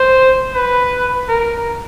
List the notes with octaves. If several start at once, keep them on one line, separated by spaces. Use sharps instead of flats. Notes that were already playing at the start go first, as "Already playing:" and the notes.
Already playing: C5
B4
A#4